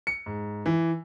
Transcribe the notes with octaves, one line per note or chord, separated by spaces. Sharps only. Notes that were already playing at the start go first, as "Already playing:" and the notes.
C#7
G#2
E3